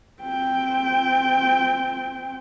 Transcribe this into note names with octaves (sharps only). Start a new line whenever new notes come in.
C4 G5